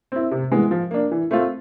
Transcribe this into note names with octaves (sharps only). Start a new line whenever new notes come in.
C4 E4
C3
E3 G#3 B3
F3
A#3 D4
E3
A3 C4 F4